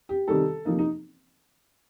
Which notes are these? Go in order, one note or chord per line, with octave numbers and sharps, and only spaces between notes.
G4
C3 D#3 G3 A4
C3 F3 A#3 D#4
D#4